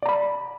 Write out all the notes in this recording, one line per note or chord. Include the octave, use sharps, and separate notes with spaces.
D5 A#5 B5